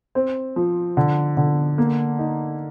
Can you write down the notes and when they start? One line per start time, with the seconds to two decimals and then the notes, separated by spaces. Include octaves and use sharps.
0.15 C4
0.56 F3
0.97 D3
1.37 D3
1.78 A#3
2.19 D#4